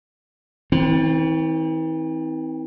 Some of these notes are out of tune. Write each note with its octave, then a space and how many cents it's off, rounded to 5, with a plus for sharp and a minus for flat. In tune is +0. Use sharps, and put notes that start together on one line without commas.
E3 -45 C4 +0